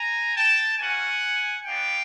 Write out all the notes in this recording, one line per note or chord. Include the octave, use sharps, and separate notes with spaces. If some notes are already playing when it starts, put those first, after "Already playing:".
Already playing: G#5 A#5
G5 A5
A#3 C#4 F#4 F#5 G#5
B3 D4 F#4 F5 G5